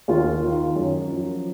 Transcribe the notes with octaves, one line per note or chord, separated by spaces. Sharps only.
D#2 F4
D#3
F#2
F3